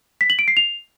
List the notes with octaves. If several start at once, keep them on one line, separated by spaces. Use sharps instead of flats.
B6
F#7
D7
C7
F7